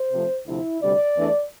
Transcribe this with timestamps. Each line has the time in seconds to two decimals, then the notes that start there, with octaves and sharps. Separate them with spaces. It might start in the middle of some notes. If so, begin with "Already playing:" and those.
Already playing: C5
0.12 C3 F3 A3 C4
0.46 D2 C3 F3 E4
0.81 D2 C3 G3 D5
1.16 E2 E3 A3 D4